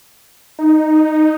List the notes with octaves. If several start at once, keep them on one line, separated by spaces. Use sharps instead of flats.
D#4